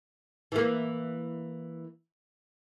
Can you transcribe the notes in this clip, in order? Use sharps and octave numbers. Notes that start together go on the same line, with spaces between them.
E3 A#3